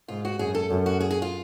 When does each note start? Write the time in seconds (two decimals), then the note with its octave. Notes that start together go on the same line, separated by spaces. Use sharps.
0.08 G#2 F4
0.25 F#4
0.39 F#2 G#4
0.55 A4
0.70 F#2
0.86 F#4
1.01 G#4
1.11 G#4
1.22 F4